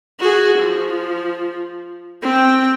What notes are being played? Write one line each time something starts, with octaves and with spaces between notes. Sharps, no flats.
F#4 G#4
F3
C4 G5